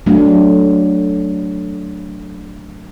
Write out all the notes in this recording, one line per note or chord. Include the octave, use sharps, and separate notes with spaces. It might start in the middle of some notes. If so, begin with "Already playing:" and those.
F#3 A3 D4